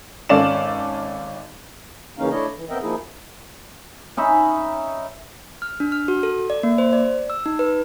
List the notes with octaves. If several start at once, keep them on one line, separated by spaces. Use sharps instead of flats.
G#1 C#4 A4 D5 F5 E7
C#3 E3 A#3 C#4 D#4 F5
A3 D4 E4 C#5 D#5
E3
B3 C4 A#4 D#5 E5 G5
F3 A#3 D#4 E4 G#4
C#4 D#4 E5 B5
F6
D4
F6
F#4
A4
D5
A#3
C5
D5
E6
D#4
B4